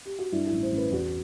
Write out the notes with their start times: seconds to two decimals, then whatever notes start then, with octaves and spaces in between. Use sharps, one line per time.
0.05 G4
0.19 F#4
0.32 G2 E4
0.47 E4
0.52 A1
0.63 C5
0.72 A1
0.78 B4
0.92 E2 F#4